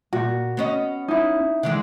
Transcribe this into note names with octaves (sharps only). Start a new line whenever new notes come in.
A#2 F#4
B3 C#4 D#5
D#4 E4
D3 E3 G#3